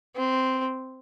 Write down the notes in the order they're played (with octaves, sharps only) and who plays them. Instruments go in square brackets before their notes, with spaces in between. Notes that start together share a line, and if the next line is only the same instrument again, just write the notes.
[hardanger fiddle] C4